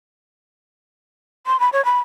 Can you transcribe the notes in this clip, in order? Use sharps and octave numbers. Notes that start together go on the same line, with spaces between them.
C6
B5
C#5
B5